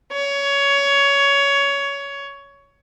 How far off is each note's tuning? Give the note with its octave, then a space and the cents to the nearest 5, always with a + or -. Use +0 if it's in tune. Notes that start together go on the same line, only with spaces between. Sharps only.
C#5 +20